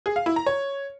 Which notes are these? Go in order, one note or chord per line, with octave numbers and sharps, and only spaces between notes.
G#4
F5
E4
A#5
C#5